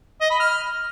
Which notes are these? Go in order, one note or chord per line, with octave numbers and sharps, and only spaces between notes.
D#5
B5
F6